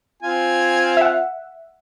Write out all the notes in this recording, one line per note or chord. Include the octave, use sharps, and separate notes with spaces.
C4 F4 G#5
E5 F#5